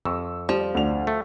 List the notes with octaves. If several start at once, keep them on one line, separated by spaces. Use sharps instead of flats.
F2 C#6 E6
F3 G3
D2 D4 F7
A3